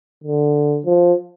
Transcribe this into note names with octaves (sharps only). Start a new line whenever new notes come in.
D3
F3